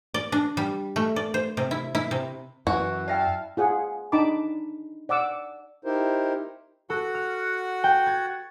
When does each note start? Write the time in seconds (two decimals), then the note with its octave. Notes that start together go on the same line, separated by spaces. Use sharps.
0.14 D5
0.32 D4
0.57 G3
0.96 A3
1.16 D5
1.34 C5
1.57 C3
1.71 E4
1.95 E4
2.11 C3
2.67 F#2 E3 F#4
3.08 E4 D5 E5 F5 G5 A5
3.57 F4 G#4 F#5
4.12 D4 D#4 A5 B5 D6
5.09 D5 F#5 D6 E6
5.85 D#4 E4 G4 A#4 C5
6.90 F#4 A4 F#5
7.15 F6
7.84 G5
8.06 G#6 A6